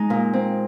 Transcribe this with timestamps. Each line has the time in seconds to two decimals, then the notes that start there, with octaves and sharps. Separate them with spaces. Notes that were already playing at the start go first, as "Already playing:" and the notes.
Already playing: G#3 D#4
0.10 A#2
0.33 C4